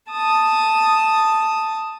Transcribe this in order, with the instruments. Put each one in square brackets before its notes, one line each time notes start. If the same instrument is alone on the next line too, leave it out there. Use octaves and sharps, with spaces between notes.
[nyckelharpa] A5 D#6